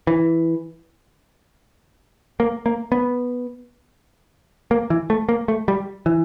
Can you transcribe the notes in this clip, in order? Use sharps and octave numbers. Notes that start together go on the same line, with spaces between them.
E3
A#3
A#3
B3
A#3
E3
A3
A#3
A3
G3
E3